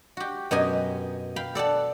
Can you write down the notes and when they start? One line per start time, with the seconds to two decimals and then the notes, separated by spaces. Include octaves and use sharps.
0.17 F#4 G4
0.51 F#2 B2 G4 D#5 G#5
1.36 F5 G5 B5
1.55 A4 D5 F#5 A5